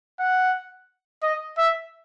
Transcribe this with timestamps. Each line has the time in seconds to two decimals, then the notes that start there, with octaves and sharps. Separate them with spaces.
0.20 F#5
1.23 D#5
1.58 E5